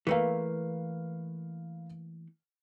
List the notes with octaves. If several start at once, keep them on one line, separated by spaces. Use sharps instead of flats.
E3 A3 A#3 B4 F5